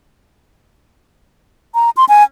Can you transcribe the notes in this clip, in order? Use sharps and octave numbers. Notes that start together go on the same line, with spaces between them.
A#5
C6
G#5